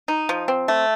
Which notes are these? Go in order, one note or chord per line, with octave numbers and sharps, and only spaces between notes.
D#4
F3
C4
A3